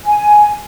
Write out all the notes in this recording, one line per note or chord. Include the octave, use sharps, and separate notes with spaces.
G#5